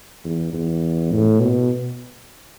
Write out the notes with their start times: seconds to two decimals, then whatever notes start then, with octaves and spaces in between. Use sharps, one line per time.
0.24 E2
0.53 E2
1.11 A2
1.40 B2